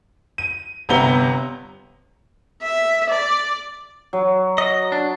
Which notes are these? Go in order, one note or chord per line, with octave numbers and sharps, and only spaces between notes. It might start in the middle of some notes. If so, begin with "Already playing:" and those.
D#7
G1 C3 G3 B3 A#5 G7
E5
D5
F#3
D#5
D4